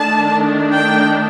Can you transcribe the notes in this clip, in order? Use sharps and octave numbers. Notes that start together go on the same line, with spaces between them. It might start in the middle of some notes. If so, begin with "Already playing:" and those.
Already playing: D#3 A3 D4 A5
G5